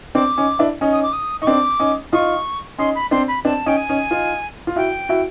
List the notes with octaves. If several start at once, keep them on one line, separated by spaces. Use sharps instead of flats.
C4 D4 D6
C#4 D#4
D4 E4
C#4 D#4
D#6
D6
D#6
D#4 C#6
C4 D4 D6
C#4 D#4
D#4 F4 C#6
C#4 D#4 C6
B5
C4 D4 C6
B5
C4 D4 A5
C#4 D#4 G5
G#5
C#4 D#4
D#4 F4
F4
E4 F#4 G5
E4 F#4